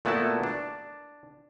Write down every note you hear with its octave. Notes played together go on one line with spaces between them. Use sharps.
A#2 A3 B3 E4 F#4 A5
D4